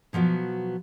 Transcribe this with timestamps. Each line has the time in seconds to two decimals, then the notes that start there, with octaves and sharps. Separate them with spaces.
0.13 B2 F3 F#3 B3